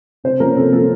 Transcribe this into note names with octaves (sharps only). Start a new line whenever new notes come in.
C3 C5
F3 A#3 C#4 A#4
C3 A4
F3 A#3 C#4 A4